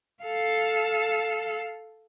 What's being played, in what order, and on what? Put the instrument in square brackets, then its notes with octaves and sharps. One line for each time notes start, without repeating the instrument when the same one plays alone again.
[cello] A4 F5